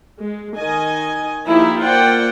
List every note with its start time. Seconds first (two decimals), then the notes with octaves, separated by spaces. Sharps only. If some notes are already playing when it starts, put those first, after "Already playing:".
0.21 G#3
0.56 D#3 D#5 G#5
1.46 F3 A#3 D#4 E4 G4
1.82 A#3 F4 C5 D5 F#5 G5